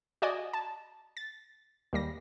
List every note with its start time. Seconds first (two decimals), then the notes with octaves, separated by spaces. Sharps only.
0.22 F#4 D5 D#5 G#5
0.53 A5
1.17 A6
1.93 D#2 G3 A#6